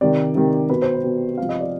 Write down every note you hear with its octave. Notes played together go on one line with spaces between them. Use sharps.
C3 D#3 D5
C3 D#3
B2 B4
C5
B4
B2
C3 F3 F5
D#5
D5